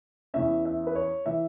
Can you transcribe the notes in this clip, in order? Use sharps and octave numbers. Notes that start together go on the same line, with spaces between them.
E2 E3 C#4 E5
E5
B4
C#5
E3 E5